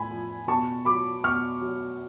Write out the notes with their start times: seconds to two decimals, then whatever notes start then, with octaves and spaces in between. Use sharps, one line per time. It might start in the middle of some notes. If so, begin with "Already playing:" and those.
Already playing: A2 G#5 B5
0.10 F3
0.48 B2 A5 C#6
0.85 F#3 B5 D6
1.24 B2 C#6 F6
1.61 F#3